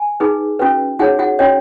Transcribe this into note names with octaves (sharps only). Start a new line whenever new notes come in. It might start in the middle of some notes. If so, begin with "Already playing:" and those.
Already playing: G#5
D#4 G#4 B4
C#4 F#4 B4
D#4 F#4 G#4 C#5 F#5
F#4 F#5
C#4 F#4 C#5 D#5